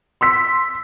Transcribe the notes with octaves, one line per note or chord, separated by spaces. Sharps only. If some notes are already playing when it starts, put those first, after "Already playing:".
C6 E6 B6